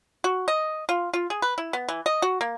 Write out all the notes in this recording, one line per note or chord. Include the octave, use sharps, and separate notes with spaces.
F#4
D#5
F4
F4
G#4
B4
E4
B3
E3
D#5
F#4
A#3